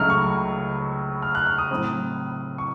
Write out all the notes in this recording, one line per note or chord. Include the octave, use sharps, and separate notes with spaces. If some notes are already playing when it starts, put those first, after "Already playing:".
Already playing: C#2 C#3 F#3 A3 D#4 F6
C#6
F6
F#6
F6
D#6
A2 F#3 C4
C#6